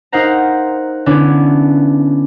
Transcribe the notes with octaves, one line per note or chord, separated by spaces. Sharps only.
D#4 A#4 C5 F5 F#5 A#5
D3 B3 C#4 D4 E4